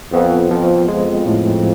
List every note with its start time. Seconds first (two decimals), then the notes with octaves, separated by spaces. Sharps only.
0.13 F2 B3
0.51 F2 F3
0.88 F2 G#3
1.26 A2